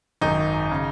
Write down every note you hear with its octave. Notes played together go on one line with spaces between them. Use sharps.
G#1 F#2 D#3 D#4
C#3